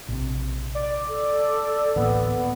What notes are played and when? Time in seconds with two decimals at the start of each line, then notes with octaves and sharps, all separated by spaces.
0.09 A#1 C3
0.75 D5
1.09 A4
1.96 D1 A1 A#3 B3